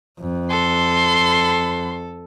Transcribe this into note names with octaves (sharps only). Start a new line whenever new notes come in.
F2
A4 C6